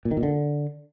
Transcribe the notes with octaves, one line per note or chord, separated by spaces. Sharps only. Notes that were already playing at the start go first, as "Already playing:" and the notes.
A#2
D#3
A#2
D3